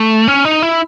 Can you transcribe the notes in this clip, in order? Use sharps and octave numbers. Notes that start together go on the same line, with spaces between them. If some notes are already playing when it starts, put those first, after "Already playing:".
Already playing: A3
C#4
D#4
E4